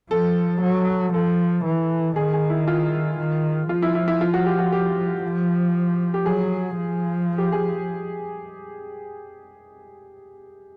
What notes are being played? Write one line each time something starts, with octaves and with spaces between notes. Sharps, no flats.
F3 A4
F#3
F3 A4
E3
D#3 G#4
G#4
E4
F4
D#3
F3 F4
E4
E4
E4
F4
F#4
G4
F#4
G4
F3
G4
F#3 G#4
F3
G4
G#4